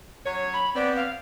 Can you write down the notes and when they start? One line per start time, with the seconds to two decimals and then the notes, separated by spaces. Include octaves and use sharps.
0.25 F#3 C#4 C#5
0.54 B5
0.75 B3 C4 D5
0.96 F5